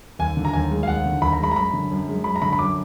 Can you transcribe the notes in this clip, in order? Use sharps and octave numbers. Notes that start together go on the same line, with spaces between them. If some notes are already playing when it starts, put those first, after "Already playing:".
D#2 G#5
D3
A#5
D#2 G#5
G#3
F5
D#2 F#5
D3
D#2 B5
A#5
G#3 B5
A#5
F#2 B5
D3
F#2
G#3
F#2 B5
A#5
D3 B5
B5
F#2 D6